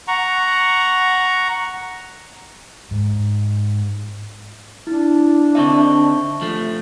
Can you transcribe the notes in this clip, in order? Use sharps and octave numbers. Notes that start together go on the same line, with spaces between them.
F#5 A#5 C#6
G#2
D4 E4
D3 C4 D#4 E5 A5 C#6
F3 A3